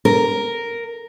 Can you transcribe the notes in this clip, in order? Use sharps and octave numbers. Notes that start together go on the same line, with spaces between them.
A#4